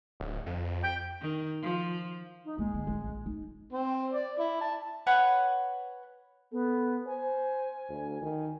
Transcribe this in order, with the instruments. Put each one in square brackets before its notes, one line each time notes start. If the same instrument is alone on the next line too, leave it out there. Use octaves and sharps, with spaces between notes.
[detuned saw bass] D1
F2
[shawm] G5
[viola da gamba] D#3
F3
[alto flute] D#4
[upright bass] G#2 A#3 [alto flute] G#3
[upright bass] D3
A1
A#1
D#4
[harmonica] C4
D5
E4
A5
[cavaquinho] B4 C#5 F#5 G#5
[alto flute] B3 [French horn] A4
[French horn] C5 [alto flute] G#5
[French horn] D2
D#3